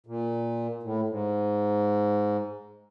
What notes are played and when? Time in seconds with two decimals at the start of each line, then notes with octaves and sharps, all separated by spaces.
0.06 A#2
0.83 A2
1.08 G#2